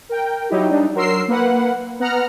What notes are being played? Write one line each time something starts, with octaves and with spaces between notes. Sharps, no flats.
A#4 G5
F#3 D#4 E4 G4
G3 D4 D#4
F#3 A#4 C6 E6 C7
A#3 B4 F#5
B3 F#5 A#5 F6